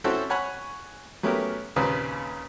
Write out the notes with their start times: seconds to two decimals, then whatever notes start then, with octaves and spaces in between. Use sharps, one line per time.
0.04 C4 C#4 E4 F#4 A4 C5
0.30 C#5 F#5 G#5 B5 F#6
1.23 F#3 A3 B3 C#4 G4 A#4
1.76 D#2 A#2 C#3 C4 B4